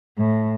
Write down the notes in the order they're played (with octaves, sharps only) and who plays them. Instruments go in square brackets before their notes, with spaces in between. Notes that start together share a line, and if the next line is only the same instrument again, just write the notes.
[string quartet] A2